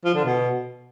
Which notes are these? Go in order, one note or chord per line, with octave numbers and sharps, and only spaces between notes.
F3
D3
B2